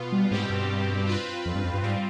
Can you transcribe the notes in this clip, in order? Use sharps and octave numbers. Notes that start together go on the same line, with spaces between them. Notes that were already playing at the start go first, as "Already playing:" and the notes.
Already playing: B2 B3 F4
G3
G#2 B2 G3 C4 G4
G2
C4 F4 B4
F2
G2
F2
G2
G#2 G3 C4 F4